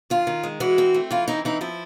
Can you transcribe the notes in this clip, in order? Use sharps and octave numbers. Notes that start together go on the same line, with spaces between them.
D#3 F4
D#3
G#3
E3 F#4
C4
A3
E3 F4
C4 D#4
E3 D#4
F3 E4